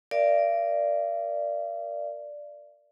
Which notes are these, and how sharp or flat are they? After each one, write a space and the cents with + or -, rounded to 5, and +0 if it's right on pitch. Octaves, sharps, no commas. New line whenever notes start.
A#4 +5 D5 +0 F5 -40